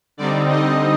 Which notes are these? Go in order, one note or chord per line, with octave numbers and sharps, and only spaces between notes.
D3 G3 C4 D#4 D5
D#5